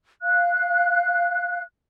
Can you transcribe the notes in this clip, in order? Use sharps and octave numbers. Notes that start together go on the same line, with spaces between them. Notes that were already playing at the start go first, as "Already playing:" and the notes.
F5 F#6